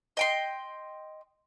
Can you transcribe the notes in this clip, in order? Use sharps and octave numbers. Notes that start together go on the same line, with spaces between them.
D#5 G5 C6